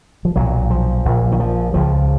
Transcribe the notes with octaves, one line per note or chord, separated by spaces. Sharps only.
F3
B1 A#2 F#3
F3
A#1 A#2
D#3
F3
C#2 C#3 F3